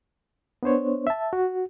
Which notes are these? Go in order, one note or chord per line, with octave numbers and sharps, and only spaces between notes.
B3 D4 C5 C#5
E5 A5
F#4